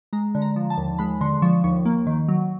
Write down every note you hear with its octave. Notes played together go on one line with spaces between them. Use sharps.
G#3 A#5
D3
A#5
F3
A5
D#2
G#3 B5
D3 C6
F3 C#6
D#2 C#6
A#3
D#3
F#3